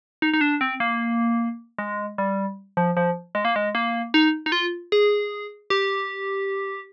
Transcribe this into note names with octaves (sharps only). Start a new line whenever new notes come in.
D#4
D#4
D4
C4
A#3
G#3
G3
F3
F3
G#3
A#3
G#3
A#3
D#4
D#4
F4
G#4
G4